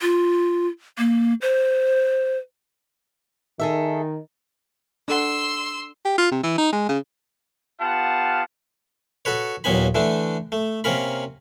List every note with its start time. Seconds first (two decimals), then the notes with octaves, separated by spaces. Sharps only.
0.01 F4
0.98 A#3
1.42 C5
3.60 D#3 G#4 A4 E5
5.08 D4 A4 F#5 C6 E6
6.05 G4
6.18 F4
6.32 C3
6.43 E3
6.58 D#4
6.73 G#3
6.89 C#3
7.80 B3 F4 G4 F5 F#5 A5
9.25 F#4 A4 B4 C#5
9.64 D#2 A#2 F#3 B3 G#5 B5
9.95 D3 E3 A3 D4
10.52 A3
10.84 C3 A#3 C#4 A#4 B5